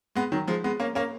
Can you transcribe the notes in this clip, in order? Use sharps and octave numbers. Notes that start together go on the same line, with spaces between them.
G#3 B3
D#3 F#3
F3 G#3
G#3 B3
A#3 C#4
A#3 C#4